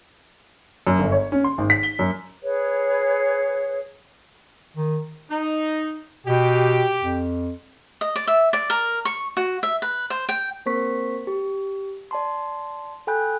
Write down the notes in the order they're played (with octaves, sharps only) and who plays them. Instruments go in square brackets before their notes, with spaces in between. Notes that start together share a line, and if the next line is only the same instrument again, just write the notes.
[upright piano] F#2
G1
C#5
C#4
C6
G#1
B6
G7
F#2
[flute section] G#4 B4 C#5
[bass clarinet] D#3
[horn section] D#4
[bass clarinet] B2 [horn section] G4
[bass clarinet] F2
[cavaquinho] D#5
D5
E5
D5
A#4
C#6
F#4
E5
B4
C5
G5
[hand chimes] A#3 C4 A#4 C5 C#6 B6
G4
D5 A5 C6
A4 G5 G#5 B5 F#6 G6